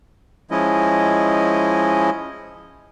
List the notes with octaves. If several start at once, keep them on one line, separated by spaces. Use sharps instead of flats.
F3 G#3 C#4 E4 D#5